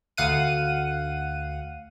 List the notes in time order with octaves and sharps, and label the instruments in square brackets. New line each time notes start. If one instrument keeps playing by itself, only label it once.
[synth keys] D2 F5 F#5 D#7